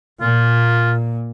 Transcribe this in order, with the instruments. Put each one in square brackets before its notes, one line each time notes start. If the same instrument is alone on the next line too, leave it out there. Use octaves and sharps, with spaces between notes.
[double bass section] A#2 [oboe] F4